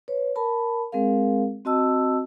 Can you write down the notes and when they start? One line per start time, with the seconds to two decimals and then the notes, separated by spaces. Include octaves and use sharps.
0.08 B4 C#5
0.36 A#4 A5 B5
0.92 G#3 C4 G#4 A#4 F5
1.65 C4 F#4 D#5 A5 E6